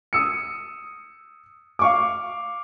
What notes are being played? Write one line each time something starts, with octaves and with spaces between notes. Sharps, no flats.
D#6 E6 C#7
F5 C#6 D6